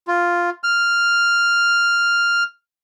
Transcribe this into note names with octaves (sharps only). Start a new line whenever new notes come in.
F4
F6